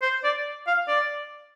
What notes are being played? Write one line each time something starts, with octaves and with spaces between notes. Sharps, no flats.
C5
D5
F5
D5